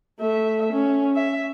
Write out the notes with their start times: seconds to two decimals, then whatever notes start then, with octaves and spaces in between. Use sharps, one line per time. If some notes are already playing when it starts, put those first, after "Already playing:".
0.20 A3 E5
0.73 C#4
1.15 E5